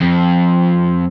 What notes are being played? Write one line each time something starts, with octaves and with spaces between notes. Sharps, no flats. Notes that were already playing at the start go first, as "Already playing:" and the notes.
F2